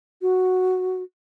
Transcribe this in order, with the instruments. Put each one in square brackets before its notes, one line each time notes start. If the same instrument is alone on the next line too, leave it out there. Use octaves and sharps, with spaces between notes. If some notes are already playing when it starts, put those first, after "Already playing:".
[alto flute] F#4